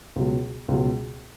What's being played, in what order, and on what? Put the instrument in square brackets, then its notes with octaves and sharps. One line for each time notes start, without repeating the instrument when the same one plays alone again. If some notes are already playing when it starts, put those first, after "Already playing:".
[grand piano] C#2 B2 F#3
C#2 B2 F#3